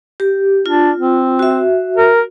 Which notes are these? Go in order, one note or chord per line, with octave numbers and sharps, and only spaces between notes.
G4
D4 F4
C4
F#4 E5
A#4